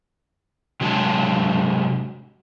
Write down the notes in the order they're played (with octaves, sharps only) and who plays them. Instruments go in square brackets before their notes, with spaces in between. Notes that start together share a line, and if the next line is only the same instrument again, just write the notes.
[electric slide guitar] C3 F#3 G#3 D4 A5